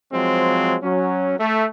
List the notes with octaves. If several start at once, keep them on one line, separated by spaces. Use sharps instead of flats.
F3 F#3 G#3 C4
F#3 C#4
A3